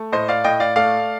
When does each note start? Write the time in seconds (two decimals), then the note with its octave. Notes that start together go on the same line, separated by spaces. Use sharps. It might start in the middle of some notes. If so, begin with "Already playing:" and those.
Already playing: A3
0.12 A2 C5 D#5
0.28 D5 F5
0.44 A2 D#5 G5
0.60 D5 F5
0.76 A3 D5 F5